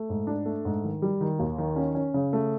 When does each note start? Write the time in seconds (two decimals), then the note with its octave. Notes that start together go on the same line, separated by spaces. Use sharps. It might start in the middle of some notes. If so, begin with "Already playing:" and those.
Already playing: A3
0.09 G#2
0.27 D4
0.46 A3
0.65 G#2
0.84 D#3
1.02 G3
1.21 D#3
1.39 D#2
1.58 D#3
1.76 C#4
1.95 C#4
2.14 C#3
2.33 A3